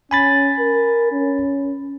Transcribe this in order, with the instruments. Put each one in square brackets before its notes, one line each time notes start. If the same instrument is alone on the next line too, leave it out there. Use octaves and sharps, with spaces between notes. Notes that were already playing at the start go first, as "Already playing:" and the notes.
[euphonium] C#4 [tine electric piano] G#5 B5 A6
[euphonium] A#4
C#4